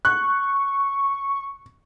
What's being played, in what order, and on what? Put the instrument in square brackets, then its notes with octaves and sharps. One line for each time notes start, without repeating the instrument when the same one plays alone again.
[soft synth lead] C#6 [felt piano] F#6